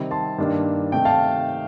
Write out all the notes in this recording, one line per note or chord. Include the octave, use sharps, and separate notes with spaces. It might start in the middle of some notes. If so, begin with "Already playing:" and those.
Already playing: C3 D#3 G3 C4
A5 C6
G2 D#3 A#3 D4
C3 D#3 A3 G5
F5 A5